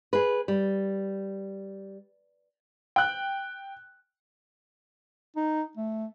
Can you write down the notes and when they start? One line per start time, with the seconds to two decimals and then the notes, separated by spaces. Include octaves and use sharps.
0.13 G#4 B4
0.48 G3
2.96 G5 F#6
5.36 D#4
5.77 A3